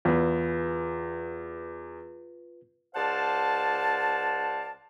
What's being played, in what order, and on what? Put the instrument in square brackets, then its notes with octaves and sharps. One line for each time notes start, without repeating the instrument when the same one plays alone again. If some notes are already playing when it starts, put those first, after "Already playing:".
[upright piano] E2 [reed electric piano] F4 B4
[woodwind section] C#2 C5 D5 F5 F#5 A5